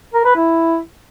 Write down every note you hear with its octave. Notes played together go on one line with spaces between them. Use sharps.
A#4
B4
E4